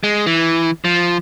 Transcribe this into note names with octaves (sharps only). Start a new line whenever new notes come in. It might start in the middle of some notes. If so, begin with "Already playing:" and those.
G#3
E3
F3